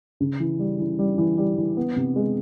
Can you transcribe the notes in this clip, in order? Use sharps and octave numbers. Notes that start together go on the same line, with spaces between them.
C#3
E3
G3
E3
G3
E3
G3
E3
B3
C3
G#3